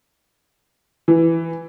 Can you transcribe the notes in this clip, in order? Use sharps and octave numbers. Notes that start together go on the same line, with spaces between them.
E3